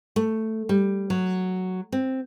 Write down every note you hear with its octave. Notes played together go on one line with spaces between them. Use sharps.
A3
G3
F#3
C4